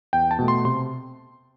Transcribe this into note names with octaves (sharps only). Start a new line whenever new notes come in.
E2 G5
A5
B2 A3
C6
C3 C6